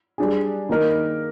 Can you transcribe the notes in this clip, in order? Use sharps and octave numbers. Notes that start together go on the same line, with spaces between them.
G3 D4 G#4
D#3 A#3 D#4 A#4